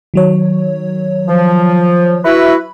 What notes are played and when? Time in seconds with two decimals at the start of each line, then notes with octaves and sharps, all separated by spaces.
0.14 D#3 F#3 C#5
1.27 F3
2.24 E4 F#4 B4 B5